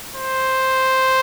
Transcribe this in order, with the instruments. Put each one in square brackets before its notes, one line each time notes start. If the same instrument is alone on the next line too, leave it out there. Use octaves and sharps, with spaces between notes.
[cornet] C5